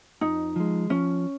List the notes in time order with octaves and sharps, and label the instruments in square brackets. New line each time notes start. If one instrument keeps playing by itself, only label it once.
[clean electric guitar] F2 [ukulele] D#4
[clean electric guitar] F3 G#3
[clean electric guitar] F3 [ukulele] C#4